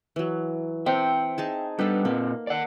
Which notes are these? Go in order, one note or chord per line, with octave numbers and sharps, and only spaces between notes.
E3 F#3
C4 E5 G5
D#4 G#4 A5
G3 B3 D4 A4
A#2 A#3 C4
D5 F#5